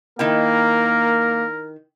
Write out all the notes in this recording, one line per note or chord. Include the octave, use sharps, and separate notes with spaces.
D#3 A#3 E4 A#4 G5